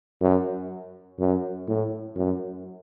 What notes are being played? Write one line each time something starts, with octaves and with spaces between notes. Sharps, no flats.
F#2
F#2
A2
F#2